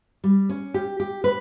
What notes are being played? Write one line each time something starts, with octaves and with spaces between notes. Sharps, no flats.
G3
C#4
G4
G4
B4